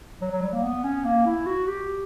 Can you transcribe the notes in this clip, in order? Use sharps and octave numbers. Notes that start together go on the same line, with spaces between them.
F#3
F#3
G3
A#3
B3
C#4
A#3
E4
F#4
G4